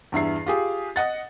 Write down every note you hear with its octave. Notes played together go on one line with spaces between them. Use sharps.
E2 G2 E4 C7
F4 G4 G#4
D#5 F#5 A6